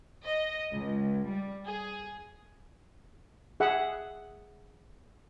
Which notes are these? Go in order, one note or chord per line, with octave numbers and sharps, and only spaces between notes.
D#5
C#2
G3
G#4
G#4 E5 F#5